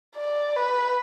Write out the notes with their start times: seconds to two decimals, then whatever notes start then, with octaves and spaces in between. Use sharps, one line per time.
0.16 D5
0.56 B4